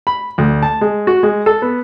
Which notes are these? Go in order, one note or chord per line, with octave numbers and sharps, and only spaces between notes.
B5
D2
A5
G#3
F#4
G#3
A4
B3